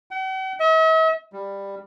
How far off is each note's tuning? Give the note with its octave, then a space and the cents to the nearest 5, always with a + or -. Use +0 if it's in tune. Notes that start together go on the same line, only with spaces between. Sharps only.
F#5 +45
E5 -45
G3 +15